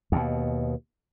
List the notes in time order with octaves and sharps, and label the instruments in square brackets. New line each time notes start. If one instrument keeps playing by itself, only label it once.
[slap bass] D#2 B2